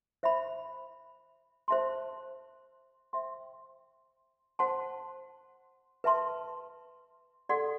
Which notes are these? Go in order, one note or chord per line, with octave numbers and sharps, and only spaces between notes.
C5 E5 B5
C5 E5 A5 C6
C5 E5 G5 C6
C5 F#5 A5 C6
B4 E5 A5 C6
A4 D5 F#5 C6